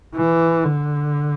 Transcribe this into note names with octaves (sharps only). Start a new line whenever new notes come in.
E3
D3